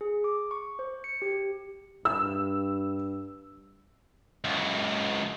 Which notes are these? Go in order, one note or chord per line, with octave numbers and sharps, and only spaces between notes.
G#4
D6
C#6
C5
C#7
G4
G2 E6
C#2 F#2